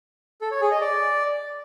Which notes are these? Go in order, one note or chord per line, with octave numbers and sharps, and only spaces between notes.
A4
C#5
G#4
D#5
D5